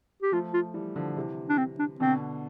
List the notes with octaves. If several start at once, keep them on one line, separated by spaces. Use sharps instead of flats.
G4
F3 A3 F4
F4
E3 G3
D3 F3
C3 E3
D4
C4
D4
B2 D3 C4